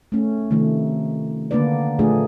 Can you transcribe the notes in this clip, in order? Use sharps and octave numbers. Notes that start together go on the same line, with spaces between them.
A3 C#4
C3 D#3 F3 A3
D3 A#3 B3 D4 B4 D5
A#2 F3 A3 D4 G#4